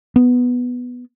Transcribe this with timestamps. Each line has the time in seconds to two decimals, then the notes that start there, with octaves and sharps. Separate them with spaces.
0.16 B3